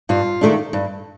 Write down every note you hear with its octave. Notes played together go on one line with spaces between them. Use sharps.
G2 F4
D#3 F#3 A3 D4
G2